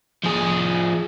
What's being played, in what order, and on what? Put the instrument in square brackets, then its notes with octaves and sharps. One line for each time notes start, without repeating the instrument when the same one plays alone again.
[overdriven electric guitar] F3 G#4